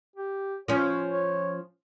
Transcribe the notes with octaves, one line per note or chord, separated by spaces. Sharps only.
G4
F3 C#4 C#5
C#5